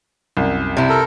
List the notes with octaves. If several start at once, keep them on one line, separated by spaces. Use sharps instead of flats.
C2 F#2
C3 E4
A4 A#4